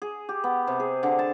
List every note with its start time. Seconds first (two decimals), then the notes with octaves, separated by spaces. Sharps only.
0.02 G#4
0.29 G4
0.44 B3
0.67 C3
0.80 G#4
1.03 D3
1.19 A5